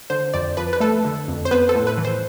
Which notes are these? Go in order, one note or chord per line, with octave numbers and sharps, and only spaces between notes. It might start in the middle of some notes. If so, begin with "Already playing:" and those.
D3 C5
F2 D5
F3 B4
B4
A3 A4
D3
F2
C5
B3 B4
A4
A2
B4
E3
C5